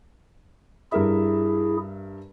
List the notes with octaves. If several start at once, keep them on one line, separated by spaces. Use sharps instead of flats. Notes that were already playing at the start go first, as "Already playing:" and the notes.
G2 E4 G#4 A#4 E5